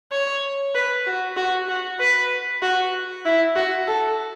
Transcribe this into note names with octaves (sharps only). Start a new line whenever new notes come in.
C#5
B4
F#4
F#4
F#4
B4
F#4
E4
F#4
A4